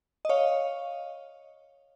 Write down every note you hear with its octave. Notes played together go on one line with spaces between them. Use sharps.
D#5
C#5 F5